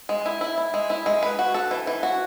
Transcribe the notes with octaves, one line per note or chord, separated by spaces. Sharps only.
G#3
E4
E4
E4
G#3
E4
G#3
B4
F#4
A4
E3
E3
F#4